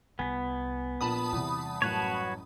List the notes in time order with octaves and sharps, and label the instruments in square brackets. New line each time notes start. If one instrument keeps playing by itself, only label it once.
[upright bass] C2 [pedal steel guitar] B3 [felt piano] G#5 B6
[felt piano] A#1 A#2 [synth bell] A5 B5 D#6
[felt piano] E2 C3 [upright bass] G3
[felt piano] A1 F#2 [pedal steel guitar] F#4 B4 C#5